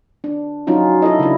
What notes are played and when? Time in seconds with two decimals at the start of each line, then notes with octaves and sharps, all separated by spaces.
0.24 D4
0.67 F#3 C#4 D#4 F4 F#4
1.02 E4 A4 D#5
1.19 C#3 D4 E4